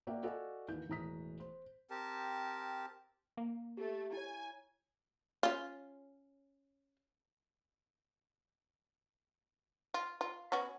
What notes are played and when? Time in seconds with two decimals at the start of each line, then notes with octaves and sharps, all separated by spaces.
0.07 A#3 F#4 D5 E5 G5
0.23 F#4 A4 D5 D#5 F5 G#5
0.68 D#2 E3 G6
0.88 E1 A2 E3 A#5 D#6 B6
1.40 C5
1.90 C4 G4 A#4 A5
3.37 A#3
3.77 A3 G4
4.13 E4 C#5 G#5
5.43 C#4 F4
9.94 F4
10.21 F4
10.52 B3 C#4 F#4